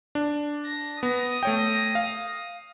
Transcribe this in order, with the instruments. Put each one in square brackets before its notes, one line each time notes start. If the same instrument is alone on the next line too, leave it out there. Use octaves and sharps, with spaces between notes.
[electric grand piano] D4
[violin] A#6
[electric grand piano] B3 [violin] D#6 A#6
[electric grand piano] A3 C#5 G5
F5